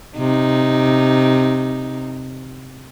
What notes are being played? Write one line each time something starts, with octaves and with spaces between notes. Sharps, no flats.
C3 D#4